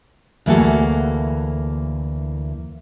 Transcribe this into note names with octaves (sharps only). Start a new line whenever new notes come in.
D2 E3 A#3 F#4 G#4 A4